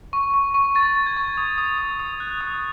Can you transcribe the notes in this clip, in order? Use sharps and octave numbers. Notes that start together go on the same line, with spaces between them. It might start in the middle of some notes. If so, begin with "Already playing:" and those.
C#6
C#6
C#6
C#6 A6
C#6
G#6
C#6
D#6
D#6
D#6
D#6
F#6
D#6